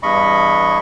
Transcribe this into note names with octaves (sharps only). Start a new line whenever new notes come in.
E2 G2 D#5 B5 C#6